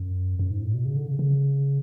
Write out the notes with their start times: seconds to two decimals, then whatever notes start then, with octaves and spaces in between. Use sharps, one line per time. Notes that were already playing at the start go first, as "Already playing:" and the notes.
Already playing: F#2
0.39 F#2
0.51 G#2
0.62 A2
0.74 B2
0.85 C#3
0.96 D3
1.07 C#3
1.19 C#3